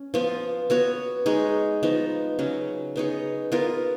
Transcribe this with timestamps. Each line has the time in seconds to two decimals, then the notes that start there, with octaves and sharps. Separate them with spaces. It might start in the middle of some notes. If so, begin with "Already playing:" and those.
Already playing: C#4
0.14 F3 B3 F4
0.70 B3 F#4 C#5
1.26 G#3 D#4 G#4 C#5
1.83 F3 B3 D#4
2.39 C#3 F#3 C#4
2.96 B3 D#4 G#4 C#5
3.52 B3 F4 A#4